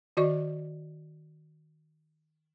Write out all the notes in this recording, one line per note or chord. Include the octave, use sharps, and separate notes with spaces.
D#3 F#4 D5 D#5 C#6